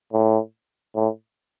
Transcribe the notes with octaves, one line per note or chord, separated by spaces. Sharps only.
A2
A2